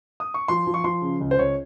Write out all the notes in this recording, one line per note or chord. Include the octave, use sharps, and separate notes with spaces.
D#6
C#6
F3 C6
F3
C#6
F3 C6
C#3
C#2
C5
C#2 C#5